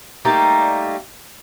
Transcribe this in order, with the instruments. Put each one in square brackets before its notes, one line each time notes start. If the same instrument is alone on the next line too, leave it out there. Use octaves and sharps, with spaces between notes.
[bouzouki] G3 A3 A#3 D#4